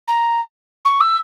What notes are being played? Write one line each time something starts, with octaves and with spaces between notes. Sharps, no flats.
A#5
C#6
E6